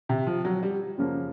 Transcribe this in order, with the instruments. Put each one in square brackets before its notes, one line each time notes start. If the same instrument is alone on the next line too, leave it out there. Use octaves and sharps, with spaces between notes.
[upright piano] C3
F3
F#3
G3
[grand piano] F#2 C#3 F3 A#3